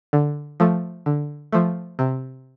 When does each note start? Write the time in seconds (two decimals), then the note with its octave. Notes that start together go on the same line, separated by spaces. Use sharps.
0.13 D3
0.60 F3 A3
1.06 D3
1.52 F3 A3
1.99 C3